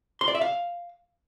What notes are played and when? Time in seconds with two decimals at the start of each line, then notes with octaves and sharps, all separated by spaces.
0.21 C6
0.28 D5
0.35 E5
0.41 F5